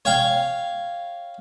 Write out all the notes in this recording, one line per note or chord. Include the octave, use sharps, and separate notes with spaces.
C#5 F5 G5